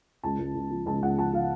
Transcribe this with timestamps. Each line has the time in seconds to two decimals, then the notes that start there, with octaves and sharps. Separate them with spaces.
0.23 C#2 A5
0.39 C#2
0.55 C#2
0.70 F3
0.86 C#2 A5
1.02 C#2 F#5
1.18 F3 A5
1.33 F3 F5